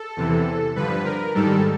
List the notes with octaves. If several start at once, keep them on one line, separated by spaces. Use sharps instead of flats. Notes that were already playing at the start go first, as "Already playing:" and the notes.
Already playing: A4
E2 C3 E3
G2 D3 F3 B4
A#4
G#2 D#3 G3 A4